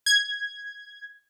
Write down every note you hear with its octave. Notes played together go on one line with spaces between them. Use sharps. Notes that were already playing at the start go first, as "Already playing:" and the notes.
G#6